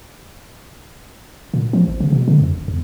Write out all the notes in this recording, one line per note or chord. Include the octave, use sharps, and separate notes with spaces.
A#2
F3
G#1
C#3
B2
D3
F2
D1
E2